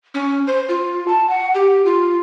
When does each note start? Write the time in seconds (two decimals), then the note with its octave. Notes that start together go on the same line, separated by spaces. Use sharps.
0.14 C#4
0.47 C5
0.69 F4
1.08 A5
1.29 F#5
1.55 G4
1.85 F4